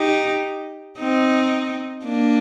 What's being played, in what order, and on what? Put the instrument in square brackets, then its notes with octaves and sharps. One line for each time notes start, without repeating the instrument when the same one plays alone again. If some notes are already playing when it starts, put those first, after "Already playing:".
Already playing: [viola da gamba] D#4 G4
C4 D#4
A#3 D4